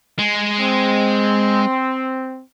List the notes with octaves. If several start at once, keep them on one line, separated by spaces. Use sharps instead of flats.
G#3
C4